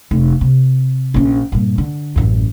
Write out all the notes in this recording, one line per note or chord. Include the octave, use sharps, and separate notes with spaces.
F1
C3
A#1 C#4
G2 A#2
D3
A1 F#2